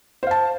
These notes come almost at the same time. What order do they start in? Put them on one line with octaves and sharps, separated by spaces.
C5 F5 A5